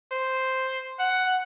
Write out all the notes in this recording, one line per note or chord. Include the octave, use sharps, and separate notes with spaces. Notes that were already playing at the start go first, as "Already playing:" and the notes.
C5
F#5